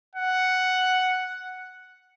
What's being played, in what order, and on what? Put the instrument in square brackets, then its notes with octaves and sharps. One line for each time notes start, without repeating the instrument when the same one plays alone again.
[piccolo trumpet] F#5